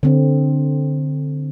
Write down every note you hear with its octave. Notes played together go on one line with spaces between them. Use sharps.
D3 C4